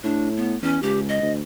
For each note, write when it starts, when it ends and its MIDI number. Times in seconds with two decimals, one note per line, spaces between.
0.04 0.55 45
0.04 0.29 62
0.37 0.57 59
0.62 0.78 40
0.62 0.80 61
0.83 1.18 37
0.83 1.00 67
1.09 1.31 75
1.21 1.42 38